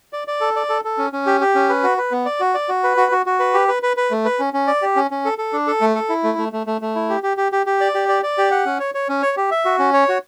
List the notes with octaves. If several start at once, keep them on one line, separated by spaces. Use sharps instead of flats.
D5
D5
A4
D5
A4
A4
C#4
C#4
G4
G4
C#4
B4
F#4
B4
B3
D5
F#4
D5
F#4
B4
F#4
F#4
F#4
B4
G4
B4
B4
B4
A3
B4
C#4
C#4
D5
G4
C#4
C#4
A4
A4
D4
A4
A3
A4
E4
A3
A3
A3
A3
A3
E4
G4
G4
G4
G4
G4
D5
G4
D5
D5
G4
F#5
C#4
C#5
C#5
C#4
C#5
G4
E5
F#4
C#4
C#5
F#4